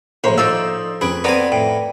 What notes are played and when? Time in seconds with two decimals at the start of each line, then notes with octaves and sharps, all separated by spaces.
0.24 A#1 A2 C5 C#5 A#5 C6
0.38 F3 D#4 A4 D5 E6
1.01 F2 G#4 B4 B5 D7
1.24 B3 C4 B4 D5 G#5 A#5 D6
1.52 A2 G5